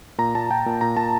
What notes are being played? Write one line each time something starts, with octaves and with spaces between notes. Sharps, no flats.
A#2 A#5
A#2 A5
A#2 G5
A#2
A#2 A#5
A#2 A5